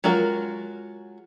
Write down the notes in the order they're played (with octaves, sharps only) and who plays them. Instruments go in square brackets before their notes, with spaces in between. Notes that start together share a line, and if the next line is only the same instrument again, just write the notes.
[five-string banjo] F#3 G#3 F4 F#4 A#4